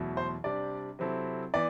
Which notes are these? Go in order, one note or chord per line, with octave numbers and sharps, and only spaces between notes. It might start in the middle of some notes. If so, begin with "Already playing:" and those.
Already playing: E2 B2 F#3 A3 E4
C5
C3 G3 D4 G4 D5
C3 F#3 C4 E4 A4
E3 B3 D5